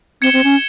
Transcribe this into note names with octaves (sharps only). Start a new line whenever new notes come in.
C4 G#6 C#7 E7 G7
C4
C#4